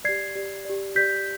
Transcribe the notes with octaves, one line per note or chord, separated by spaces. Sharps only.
G4 D5 G#6 C7
G4 D5
G4 D5
G4 D5 G6 B6